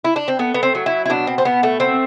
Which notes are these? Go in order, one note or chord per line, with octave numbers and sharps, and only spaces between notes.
E4
D4
C4
A3 B3
B3
C4
F#3
E4
E4
B2 D4
C4
C4
B2 B3
A3
A3 C4